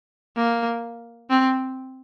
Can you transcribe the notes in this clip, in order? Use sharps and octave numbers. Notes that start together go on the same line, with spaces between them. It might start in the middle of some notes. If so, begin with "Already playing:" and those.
A#3
C4